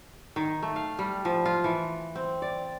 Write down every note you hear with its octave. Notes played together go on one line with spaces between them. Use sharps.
D#3
A3
F5
G3
F3
F4
E3
C4
D5